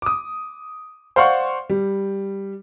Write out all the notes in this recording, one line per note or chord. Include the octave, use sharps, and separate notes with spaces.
D6 D#6
C5 D5 F5 F#5 C6 C#6
G3